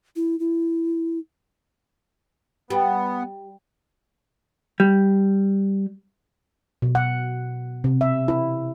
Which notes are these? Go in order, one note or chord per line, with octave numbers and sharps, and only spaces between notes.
E4
E4
G3 B3
G3
B2
F#5
C3
E5
E4